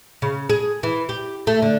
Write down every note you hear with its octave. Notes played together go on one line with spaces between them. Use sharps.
C#3
G#4
E3
G4
A3
D3